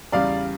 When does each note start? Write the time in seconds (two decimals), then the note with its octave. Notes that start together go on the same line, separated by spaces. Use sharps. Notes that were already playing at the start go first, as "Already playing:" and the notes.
0.12 E2 C#3 G3 D5 F5